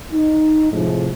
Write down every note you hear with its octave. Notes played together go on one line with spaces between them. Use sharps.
D#4
A2 C3 F3 G#3